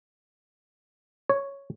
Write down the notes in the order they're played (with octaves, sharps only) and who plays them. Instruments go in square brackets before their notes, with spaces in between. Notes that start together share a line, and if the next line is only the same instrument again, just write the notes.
[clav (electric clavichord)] C#5